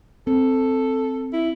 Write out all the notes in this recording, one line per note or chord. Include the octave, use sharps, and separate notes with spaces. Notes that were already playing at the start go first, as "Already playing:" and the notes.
C4 A4
E4